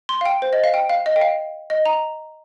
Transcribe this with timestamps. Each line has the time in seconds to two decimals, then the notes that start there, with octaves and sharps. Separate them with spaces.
0.09 C6
0.21 F5
0.26 G5
0.42 C5
0.53 D#5
0.64 F5
0.74 G5
0.90 F5
1.06 D#5
1.16 G5
1.21 F5
1.70 D#5
1.86 A#5